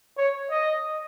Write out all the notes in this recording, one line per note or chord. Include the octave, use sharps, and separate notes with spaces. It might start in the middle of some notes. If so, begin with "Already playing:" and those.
C#5
D#5